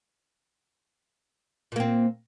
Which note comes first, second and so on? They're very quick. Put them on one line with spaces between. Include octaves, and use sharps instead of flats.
A#2 A#3 C4